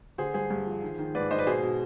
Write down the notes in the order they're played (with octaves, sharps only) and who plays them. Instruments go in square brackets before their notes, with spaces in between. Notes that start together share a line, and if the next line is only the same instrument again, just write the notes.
[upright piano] D3 G#4 C5
G2 G#4 C5
G2
F3
D#3
D#3
G#2 B4 D5
G#2 C5 D#5
B4 D5
B2 G#4 C5
B2